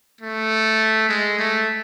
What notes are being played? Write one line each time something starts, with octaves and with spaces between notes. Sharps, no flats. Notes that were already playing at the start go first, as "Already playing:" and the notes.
A3
G#3
A3